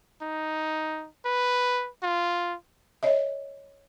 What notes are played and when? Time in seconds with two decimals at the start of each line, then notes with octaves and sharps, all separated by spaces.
0.22 D#4
1.25 B4
2.03 F4
3.03 C#5 D#5 E5